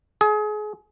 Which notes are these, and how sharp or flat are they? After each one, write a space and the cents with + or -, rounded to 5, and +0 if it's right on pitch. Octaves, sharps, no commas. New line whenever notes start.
G#4 +30